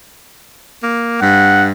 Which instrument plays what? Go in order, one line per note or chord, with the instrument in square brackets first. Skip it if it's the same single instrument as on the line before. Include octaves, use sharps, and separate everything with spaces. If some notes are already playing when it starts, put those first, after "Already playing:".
[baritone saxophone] A#3
[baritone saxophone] G2 [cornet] F#5